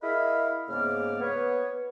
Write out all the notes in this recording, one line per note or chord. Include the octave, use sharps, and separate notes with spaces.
E4 G#4 A#4 D#5 F5 B5
G#2 C#3 A#3 B3 D5 F6
B3 B4 C#5